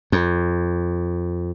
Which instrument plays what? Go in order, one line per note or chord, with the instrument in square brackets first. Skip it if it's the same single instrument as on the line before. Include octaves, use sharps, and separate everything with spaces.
[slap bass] F2